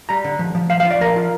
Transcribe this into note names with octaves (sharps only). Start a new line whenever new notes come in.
G3 A#5
D3
F3
F3
F3 F5
F5
F4
D5
F3 A#4
F4